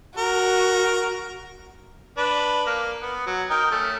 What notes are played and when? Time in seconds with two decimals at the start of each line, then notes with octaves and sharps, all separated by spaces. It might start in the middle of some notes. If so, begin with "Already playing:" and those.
0.18 F#4 A#4
2.17 D4 B4
2.66 A#3
3.02 B3
3.27 F#3
3.50 D#4 A#4 G5
3.71 A3 C#4